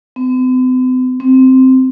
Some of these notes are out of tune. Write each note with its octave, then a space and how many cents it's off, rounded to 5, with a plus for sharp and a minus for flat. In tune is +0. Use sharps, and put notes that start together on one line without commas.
C4 -45
C4 -5